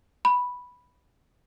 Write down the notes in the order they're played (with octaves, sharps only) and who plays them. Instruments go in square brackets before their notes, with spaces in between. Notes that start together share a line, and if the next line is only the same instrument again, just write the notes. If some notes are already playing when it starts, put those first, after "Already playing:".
[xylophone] B5